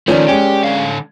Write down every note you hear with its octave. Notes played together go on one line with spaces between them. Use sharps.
D#3 F3 A3 C#4 A4 A#4 D5
G#3 C#4 G4
D3 F5